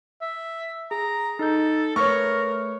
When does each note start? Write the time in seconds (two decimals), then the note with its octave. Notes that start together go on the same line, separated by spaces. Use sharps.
0.21 E5
0.91 G#4 A#5
1.39 D#4 A4 D#5 G6
1.96 A3 A#4 B4 C#5 C#6 C#7